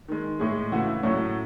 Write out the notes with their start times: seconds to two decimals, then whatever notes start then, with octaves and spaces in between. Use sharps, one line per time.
0.08 D#3 G#3
0.40 A2 G#3 G#4
0.72 C#3 E3 A3 F#4
0.88 E4
1.03 A2 F#3 A3 C#4